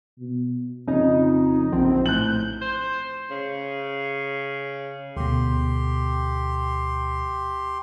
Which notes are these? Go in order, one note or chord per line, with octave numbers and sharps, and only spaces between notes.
B2
F2 C#3 D#4
A#1 C4
A2 F#6 G6 F#7
C5
C#3
D2 B2 G4 C6